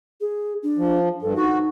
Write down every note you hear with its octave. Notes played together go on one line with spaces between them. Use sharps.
G#4
D4
F3
G2 A4
D#4 F#4